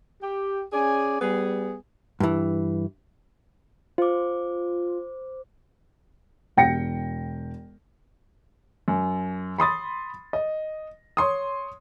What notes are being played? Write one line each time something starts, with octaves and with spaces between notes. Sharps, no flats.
G4
C#4 G#4 D5 G#5
G3 B3 G#4
G2 E3
F4 C5 D6
E1 G5 A#6 C#7
F#2
B5 C6 D#6 A6
D#5
C#5 C6 D#6